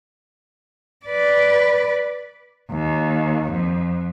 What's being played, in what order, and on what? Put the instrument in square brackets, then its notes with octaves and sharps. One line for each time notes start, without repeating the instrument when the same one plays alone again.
[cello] B4 D5
D#2
F2